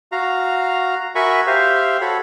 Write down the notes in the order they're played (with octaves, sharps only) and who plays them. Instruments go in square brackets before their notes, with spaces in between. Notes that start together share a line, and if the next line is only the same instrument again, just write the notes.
[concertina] F#4 F5 A#5
F#4 A#4 E5 G#5 B5 C#6
G4 C5 E5 F5
F#4 A4 C#5 B5